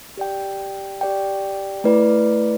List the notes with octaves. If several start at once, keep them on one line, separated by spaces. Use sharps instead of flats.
G4 D5 G5
G4 D5 G5
A3 E4 B4 D5